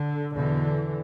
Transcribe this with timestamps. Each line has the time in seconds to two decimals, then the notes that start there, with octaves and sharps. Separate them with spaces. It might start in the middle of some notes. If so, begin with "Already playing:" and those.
Already playing: D3
0.36 E2 B2 D3 E3